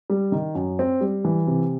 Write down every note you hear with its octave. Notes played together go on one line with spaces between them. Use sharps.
G3
D#3
F#2
C4
G3
E3
C3